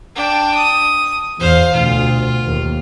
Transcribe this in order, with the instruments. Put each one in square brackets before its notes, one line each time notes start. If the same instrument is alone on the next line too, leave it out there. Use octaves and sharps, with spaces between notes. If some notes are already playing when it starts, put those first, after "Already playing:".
[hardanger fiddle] D4 G5
D#6
[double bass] E2 [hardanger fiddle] C5 F5
[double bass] D2 B2 [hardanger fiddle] F4
[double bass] D#2